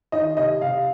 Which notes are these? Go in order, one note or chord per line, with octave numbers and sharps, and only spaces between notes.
D#3 D#5
C3 D#5
C3 F5